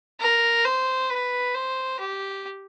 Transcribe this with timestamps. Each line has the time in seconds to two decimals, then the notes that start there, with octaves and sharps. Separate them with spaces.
0.20 A#4
0.65 C5
1.11 B4
1.55 C5
2.00 G4